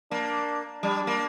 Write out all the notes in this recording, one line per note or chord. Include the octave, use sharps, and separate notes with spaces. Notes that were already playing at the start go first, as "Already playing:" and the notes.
A#3 D4
G3 D4
A#3